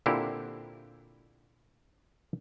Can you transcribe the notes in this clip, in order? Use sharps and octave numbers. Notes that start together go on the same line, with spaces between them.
A#2 D3 C4 E4 G4